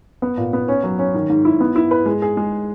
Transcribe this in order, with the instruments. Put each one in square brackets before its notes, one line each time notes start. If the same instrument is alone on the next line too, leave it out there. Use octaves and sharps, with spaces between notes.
[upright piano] B3
A#2
B3
C#4
F#3
C#4
D#3
G#2
E4
B3
E4
B4
G#3
G#4
G#3